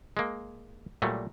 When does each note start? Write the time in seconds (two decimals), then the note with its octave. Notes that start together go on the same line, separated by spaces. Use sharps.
0.17 G#3 A#3
1.02 A#2 F#3 G3 A3